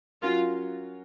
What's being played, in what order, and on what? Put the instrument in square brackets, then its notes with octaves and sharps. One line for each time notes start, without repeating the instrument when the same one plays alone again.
[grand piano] F#3 C#4 F#4 A#4 [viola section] F4